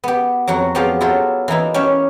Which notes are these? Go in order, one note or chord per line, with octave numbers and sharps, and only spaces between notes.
B3 G4
F2 F#3 F#4 F#5
F3 B3 G4 G#4 F5
F#3 E4 F4 G4 A4
E3 A#3 D#4 E4
C#4 G4 C#5 E5